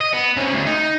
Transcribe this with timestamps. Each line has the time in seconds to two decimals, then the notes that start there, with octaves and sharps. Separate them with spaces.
0.01 D#5
0.13 B3
0.37 C3 C#4
0.53 D2
0.66 D#4